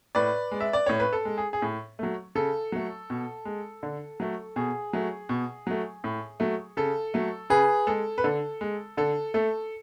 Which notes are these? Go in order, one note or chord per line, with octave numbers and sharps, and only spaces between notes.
A2 B4 D5
G#3
E5
D5
A2 C#5
B4
A4
G#3
G#4
G#4
A2
F#3 A3
C#3 A4
F#3 A3
B2
G#3
D3
F#3 A3
B2 G#4
F#3 A3
B2
F#3 A3
A2
F#3 A3
C#3 A4
F#3 A3
C#3 G#4 B4
G#3 A4
B4
D3 A4
G#3
D3 A4
A3 A4